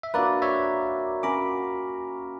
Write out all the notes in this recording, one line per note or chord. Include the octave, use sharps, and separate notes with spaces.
E5
A#3 D4 F#4 B4 D5
C#5 E5
C#4 F#4 A#4 B5 D6